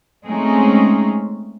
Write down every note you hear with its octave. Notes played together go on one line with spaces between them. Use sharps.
G#3 A3 C4 C#4 D#4 G#4